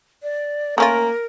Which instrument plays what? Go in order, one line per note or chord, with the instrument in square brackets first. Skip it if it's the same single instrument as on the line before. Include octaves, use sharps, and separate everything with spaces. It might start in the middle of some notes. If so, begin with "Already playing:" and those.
[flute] D5
[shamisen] A3 C#4 F4 [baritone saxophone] A#3 [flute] A#4